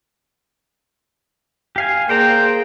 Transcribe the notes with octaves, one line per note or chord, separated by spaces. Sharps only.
G4 F5 G#5
A#3 G#4 C5 D5 G5 A#5